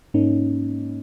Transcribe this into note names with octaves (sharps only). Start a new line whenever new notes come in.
G#2 A#3 C#4 D#4